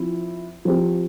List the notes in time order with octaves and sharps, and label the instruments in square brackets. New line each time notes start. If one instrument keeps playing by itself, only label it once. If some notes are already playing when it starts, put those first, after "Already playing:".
Already playing: [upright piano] F3 C4 E4
F3 C4 G4